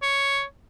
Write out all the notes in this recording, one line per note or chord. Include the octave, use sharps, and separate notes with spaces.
C#5